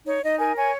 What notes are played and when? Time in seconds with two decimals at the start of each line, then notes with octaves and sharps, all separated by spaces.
0.06 D#4 C#5
0.23 D#4 D#5
0.39 A#4 G#5
0.56 C#5 G#5